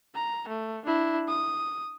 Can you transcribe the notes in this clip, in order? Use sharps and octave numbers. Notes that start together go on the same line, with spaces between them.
A#5
A3
D4 E4
D#6